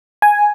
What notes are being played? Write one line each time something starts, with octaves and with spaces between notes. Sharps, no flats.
G#5